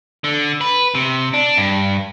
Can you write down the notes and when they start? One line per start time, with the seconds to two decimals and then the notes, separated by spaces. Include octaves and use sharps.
0.24 D3
0.61 B4
0.95 C3
1.34 D4
1.57 G2